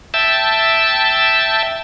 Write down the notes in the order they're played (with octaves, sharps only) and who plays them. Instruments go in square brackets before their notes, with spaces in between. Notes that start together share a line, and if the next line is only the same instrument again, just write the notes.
[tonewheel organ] E5 G5 A5